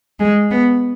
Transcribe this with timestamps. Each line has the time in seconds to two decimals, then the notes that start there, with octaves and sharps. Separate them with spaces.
0.19 G#3
0.51 B3